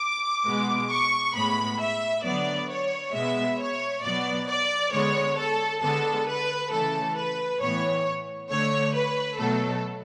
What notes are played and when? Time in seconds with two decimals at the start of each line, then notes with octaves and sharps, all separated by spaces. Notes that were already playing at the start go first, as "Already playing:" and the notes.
Already playing: D6
0.45 B2 G#3 B3
0.90 C#6
1.34 A2 G#3 B3 B5
1.80 E5
2.23 D3 F#3 B3 D5
2.69 C#5
3.13 B2 G#3 B3 E5
3.59 C#5
4.03 B2 F#3 B3 D5
4.47 D5
4.92 D3 G#3 B3 C#5
5.37 A4
5.81 D3 G#3 B3 A4
6.27 B4
6.71 C#3 E3 A3 A4
7.15 B4
7.61 A2 E3 B3 C#5
8.50 D3 A3 C#5
8.94 B4
9.38 B2 F#3 A3 A4